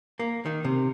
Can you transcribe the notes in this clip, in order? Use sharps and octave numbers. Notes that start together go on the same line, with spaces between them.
A#3
D#3
C3